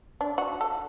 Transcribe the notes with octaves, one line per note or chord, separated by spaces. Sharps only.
D4
F#4
A4